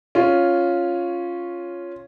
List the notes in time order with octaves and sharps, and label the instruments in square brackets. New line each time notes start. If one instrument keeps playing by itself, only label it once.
[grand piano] C#4 F4